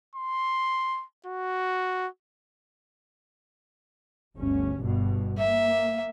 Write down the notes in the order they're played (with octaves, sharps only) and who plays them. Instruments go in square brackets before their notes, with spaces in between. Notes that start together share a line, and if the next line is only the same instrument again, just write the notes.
[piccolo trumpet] C6
F#4
[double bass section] G1 D2 C#4
G1 G2 B2
[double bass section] A#3 [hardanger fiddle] E5